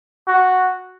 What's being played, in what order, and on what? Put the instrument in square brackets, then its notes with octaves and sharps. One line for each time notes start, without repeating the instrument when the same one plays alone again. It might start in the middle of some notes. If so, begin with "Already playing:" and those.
[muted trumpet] F#4